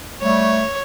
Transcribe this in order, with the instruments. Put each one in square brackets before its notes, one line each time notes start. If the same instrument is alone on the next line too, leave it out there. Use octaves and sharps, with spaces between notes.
[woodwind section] G3 A3 [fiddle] C#5